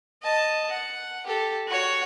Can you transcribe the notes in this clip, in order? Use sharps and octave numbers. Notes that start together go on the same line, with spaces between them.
D#5 A5
F#5
G4 A4
F#4 C#5